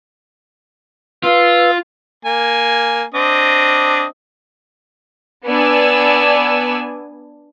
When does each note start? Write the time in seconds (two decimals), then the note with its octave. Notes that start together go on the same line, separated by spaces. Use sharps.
1.24 F4 B4 F5 E6
2.25 A#3 G#5
3.14 C4 D4 D#5
5.47 B3 D4 D5 G#5 E6